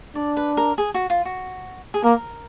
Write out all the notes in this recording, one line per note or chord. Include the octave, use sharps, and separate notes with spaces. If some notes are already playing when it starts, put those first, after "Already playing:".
D4 D5
B4
A#4
G#4
F#4
F4
F#4
G#4
A#3 A#4